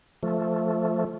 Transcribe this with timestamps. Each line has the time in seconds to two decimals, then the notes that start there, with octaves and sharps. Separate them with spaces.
0.23 F3 A3